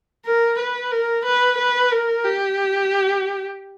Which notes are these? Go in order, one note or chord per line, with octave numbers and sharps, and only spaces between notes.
A#4
B4
A#4
B4
B4
A#4
G4